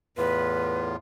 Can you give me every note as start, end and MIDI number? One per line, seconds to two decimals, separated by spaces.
0.17 0.96 40
0.17 0.96 45
0.17 0.96 65
0.17 0.87 71